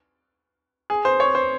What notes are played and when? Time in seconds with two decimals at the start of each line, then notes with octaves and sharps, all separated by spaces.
0.90 G#4
1.05 C5
1.20 C#5
1.35 C5